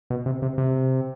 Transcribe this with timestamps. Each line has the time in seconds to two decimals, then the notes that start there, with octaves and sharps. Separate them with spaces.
0.10 B2
0.26 C3
0.42 C3
0.58 C3